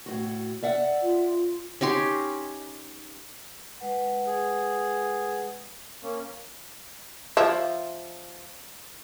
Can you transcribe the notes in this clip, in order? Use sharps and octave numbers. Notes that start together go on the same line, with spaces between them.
A2 F#4
D5 E5 F#5
F4
C#4 D#4 G4 C6
G#3 B4 F#5
G#4
A#3 C#4
F3 E5